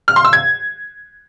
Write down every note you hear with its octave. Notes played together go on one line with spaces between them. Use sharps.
F6
C6
E6
G#6